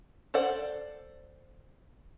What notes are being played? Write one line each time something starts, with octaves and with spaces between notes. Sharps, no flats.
A4 C5 D5 F#5